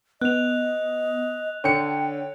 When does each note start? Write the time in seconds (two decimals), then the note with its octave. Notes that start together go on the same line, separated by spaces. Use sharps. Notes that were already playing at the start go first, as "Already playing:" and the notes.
0.21 B3 D#5 F#6 F7
1.64 D3 C#5 G5 C#7